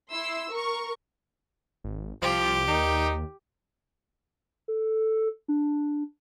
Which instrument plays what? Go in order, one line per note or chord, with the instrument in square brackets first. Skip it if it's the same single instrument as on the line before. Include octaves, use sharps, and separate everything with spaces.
[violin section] E4 C6 E6
A#4 C#6
[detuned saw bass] G#1
[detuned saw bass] C2 [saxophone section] F3 [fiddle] G4
[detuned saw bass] D#2 [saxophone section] G3 A#3 D#4
[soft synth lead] A4
D4